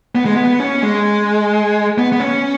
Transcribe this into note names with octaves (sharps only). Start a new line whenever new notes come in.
B3
G#3
B3
C#4
G#3
B3
B3
C#4